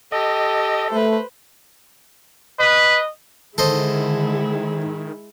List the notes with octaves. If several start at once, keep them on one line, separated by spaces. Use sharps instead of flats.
G4 A4 D#5
A3 B4 C5
B4 D#5
D3 D#3 G#3 E4 A4 C5 D#5